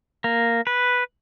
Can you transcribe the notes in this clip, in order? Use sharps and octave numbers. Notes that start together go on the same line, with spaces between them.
A#3
B4